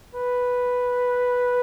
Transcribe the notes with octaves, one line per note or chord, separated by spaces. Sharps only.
B4